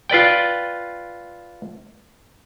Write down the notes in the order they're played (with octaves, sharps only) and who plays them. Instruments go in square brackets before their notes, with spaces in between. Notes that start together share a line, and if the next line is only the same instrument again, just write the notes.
[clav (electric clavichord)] F4 B4 D5 G5